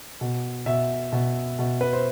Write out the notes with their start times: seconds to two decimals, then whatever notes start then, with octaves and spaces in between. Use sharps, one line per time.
0.21 B2
0.66 B2 E5
1.12 B2
1.59 B2
1.81 B4
1.93 C5